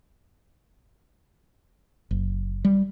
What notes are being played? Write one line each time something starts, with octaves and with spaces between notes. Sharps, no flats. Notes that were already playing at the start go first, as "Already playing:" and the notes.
F#1
G3